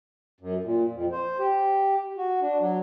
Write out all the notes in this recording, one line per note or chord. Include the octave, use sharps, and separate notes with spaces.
F#2
A#2
F2
C5
G4
F#4
D4
F#3